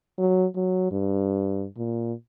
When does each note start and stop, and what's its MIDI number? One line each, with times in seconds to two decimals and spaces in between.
0.18 0.46 54
0.56 0.90 54
0.92 1.66 43
1.77 2.13 46